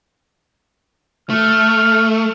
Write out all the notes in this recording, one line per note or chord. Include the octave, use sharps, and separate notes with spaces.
A3 F6